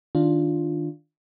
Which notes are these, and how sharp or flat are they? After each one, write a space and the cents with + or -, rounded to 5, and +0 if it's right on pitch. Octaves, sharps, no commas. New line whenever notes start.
D#3 +0 D4 +0 F4 +0